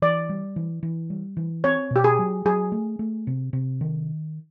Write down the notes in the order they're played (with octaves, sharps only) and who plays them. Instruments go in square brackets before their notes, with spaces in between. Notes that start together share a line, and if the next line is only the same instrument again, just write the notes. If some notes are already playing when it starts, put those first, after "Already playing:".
[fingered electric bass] E3 [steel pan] D5
[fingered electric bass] G3
E3
E3
G3
E3
[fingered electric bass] C4 [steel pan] C#5
[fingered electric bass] B2 [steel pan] G4
[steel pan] G#4
[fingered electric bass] F#3
[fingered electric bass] F#3 [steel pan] G#4
[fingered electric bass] A3
A3
C3
C3
D#3